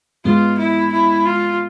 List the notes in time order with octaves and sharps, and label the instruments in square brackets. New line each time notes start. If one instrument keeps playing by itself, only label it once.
[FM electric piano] G#2 G#3 B3 [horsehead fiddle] F4
[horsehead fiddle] E4
E4
F4